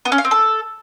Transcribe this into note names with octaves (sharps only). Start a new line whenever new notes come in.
B3
C#4
F5
C4
A4